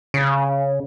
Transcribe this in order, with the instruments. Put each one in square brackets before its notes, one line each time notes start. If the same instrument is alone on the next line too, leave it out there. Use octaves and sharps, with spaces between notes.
[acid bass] C#3